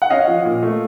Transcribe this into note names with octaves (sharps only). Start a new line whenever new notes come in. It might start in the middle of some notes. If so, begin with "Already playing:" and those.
F#5
C#4 D#5 F5
F3
A#2
A3